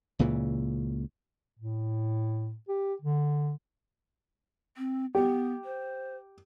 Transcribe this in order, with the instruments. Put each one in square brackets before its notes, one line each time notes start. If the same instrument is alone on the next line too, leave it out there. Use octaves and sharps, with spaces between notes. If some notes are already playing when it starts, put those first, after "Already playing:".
[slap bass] C#2 A#2 C#3 E3
[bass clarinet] A2
G4
D3
[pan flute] C4
[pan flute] B3 [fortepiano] G4
[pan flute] C5